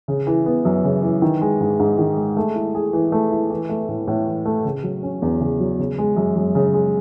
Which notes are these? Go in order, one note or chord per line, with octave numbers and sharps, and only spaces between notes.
C#3
E3
B3
F#2
C#3
E3
D#3
G#3
G#2
G#2
D#3
G#3
A3
E4
G#4
E3
A3
E4
E3
A3
A2
A2
E3
A3
C#3
F#3
C#4
E2
C#3
F#3
C#3
G#3
F#2
F#2
C#3
G#3